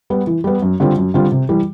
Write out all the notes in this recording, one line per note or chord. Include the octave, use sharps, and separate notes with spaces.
G3 B3
E3
G3 B3
F#2
D3 G3 C4 F4
F#2
D3 G3 C4 F4
C3
E3 G3